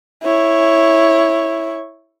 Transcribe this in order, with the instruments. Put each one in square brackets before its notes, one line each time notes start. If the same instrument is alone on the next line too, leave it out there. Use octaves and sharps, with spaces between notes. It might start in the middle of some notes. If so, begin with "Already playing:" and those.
[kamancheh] E4 C#5